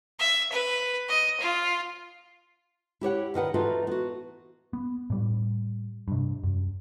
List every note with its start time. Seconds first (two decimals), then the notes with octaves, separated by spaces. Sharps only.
0.20 E5
0.52 B4
1.09 D#5
1.40 F4
3.01 E4 G4 C#5 F#5
3.34 D2 D#3 B4 F#5
3.54 E3 D#4 F4 F#4 A4 B4
3.87 B3 F#4
4.73 B3
5.10 A2 G3
6.08 G2 C3
6.44 F#2